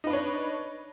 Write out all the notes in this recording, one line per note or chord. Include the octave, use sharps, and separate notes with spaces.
D4 D#4 B4 C#5